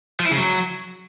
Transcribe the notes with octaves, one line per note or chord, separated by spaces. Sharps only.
F3
E4
C#3
F#3